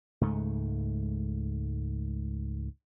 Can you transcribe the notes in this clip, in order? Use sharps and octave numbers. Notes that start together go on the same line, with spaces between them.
C#2 G#2 A3